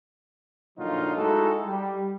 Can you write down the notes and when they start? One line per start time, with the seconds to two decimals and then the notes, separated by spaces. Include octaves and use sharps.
0.79 A#2 D3 F3 F#3 D#4 F4
1.17 G#3 A3 D#4 E4 F#4 A4
1.66 G3